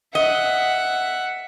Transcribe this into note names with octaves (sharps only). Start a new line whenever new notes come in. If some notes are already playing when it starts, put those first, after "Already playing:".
D#5 E5 F#5